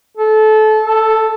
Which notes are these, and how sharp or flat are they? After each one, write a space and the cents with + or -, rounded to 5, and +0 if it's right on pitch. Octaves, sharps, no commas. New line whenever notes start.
A4 -25
A4 +5